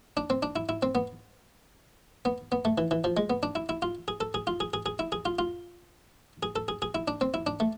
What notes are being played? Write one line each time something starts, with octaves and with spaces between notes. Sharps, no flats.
D4
C4
D4
E4
E4
C4
B3
B3
B3
A3
E3
E3
F3
G#3
B3
D4
E4
E4
F4
G#4
A4
G#4
F4
G#4
G#4
G#4
E4
G#4
F4
F4
G#4
A4
G#4
G#4
E4
D4
C4
E4
D4
A3